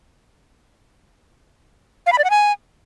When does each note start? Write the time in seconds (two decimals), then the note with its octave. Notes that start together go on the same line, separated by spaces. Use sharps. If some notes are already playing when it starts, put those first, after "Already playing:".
2.06 F5
2.12 B5
2.18 D5
2.24 F#5
2.30 G#5